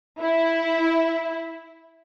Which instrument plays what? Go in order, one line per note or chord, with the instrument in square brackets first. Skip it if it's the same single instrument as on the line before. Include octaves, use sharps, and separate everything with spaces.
[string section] E4